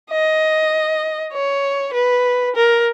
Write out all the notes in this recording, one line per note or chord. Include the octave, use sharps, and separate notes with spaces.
D#5
C#5
B4
A#4